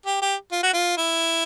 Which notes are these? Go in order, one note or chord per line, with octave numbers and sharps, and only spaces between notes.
G4
G4
F4
F#4
F4
E4